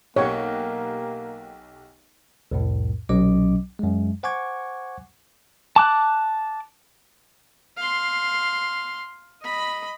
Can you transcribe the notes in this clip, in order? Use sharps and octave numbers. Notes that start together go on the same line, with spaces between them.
B1 A#3 G4 C#5 F#5
C2 F2 A2
B1 A#2 F#3 C#4 D#5 D6
F#2 G#3
C5 F#5 G#5 C#6 D6 G#6
A5 D6 F#6
F5 C6
D#5 B5